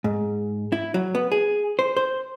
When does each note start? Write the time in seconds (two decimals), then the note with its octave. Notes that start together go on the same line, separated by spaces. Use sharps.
0.04 G#2
0.72 E4
0.94 F#3
1.15 B3
1.32 G#4
1.79 C5
1.97 C5